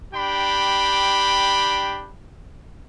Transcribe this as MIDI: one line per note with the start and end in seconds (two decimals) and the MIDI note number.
0.14 2.11 62
0.14 2.11 67
0.14 2.11 79
0.14 2.11 83